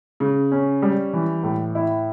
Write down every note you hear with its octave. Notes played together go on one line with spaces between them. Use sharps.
C#3
C#4
G3
E3
A2
E4